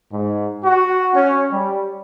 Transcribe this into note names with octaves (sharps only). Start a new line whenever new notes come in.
G#2
F#4
C#4
G3